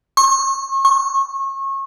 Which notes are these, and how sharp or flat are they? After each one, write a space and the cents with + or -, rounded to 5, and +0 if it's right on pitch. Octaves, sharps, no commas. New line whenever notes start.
C#6 -35
C#6 -30